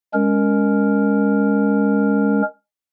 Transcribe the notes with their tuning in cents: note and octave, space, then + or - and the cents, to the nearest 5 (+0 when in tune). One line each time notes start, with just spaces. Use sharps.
G#3 -10 C#4 +15 A#4 +0